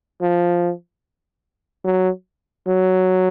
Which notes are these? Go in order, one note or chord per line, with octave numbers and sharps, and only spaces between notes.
F3
F#3
F#3